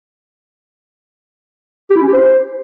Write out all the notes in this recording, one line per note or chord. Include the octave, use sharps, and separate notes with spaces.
G4
E4
C#4
G4
C5